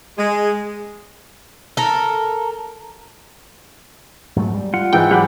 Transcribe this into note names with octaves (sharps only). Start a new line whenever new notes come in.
G#3
A4 A#4
G#2 F#3 A3
G3
F4 F#5
G#2 E3 G5
F#3 G4 F#5 B5 D6